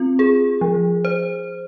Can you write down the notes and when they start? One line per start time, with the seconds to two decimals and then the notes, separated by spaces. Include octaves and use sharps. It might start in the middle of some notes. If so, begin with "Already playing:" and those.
Already playing: C4 F4
0.19 G#4
0.61 F3
1.05 C5